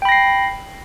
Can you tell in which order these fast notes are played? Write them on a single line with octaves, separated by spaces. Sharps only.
G5 B5 A#6 C7